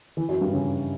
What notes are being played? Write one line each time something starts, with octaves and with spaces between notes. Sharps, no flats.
E3
F#2 F#3
G2 G3
C#3 C#4